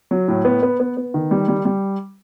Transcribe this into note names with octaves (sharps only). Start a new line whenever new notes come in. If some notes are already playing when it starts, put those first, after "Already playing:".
F#3
A2
B3
B3
B3
B3
D#3
G3
G3
G3